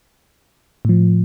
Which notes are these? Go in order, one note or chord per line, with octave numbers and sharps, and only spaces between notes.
A2 F3